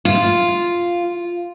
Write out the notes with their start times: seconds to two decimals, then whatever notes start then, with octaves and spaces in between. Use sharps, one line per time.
0.05 F4